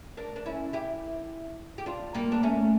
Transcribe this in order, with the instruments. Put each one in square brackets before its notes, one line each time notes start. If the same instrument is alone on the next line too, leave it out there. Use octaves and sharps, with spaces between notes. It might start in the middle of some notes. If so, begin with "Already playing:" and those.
[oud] A#3 D4
D4
C#4 E4
E4 G4
G4
D4 F4
G3 A#3
D4
A3 C#4